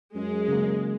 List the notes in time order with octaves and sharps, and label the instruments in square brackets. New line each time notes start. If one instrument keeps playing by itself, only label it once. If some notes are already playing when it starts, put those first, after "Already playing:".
[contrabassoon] F#2 [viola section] G#3
[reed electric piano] C#3 A#3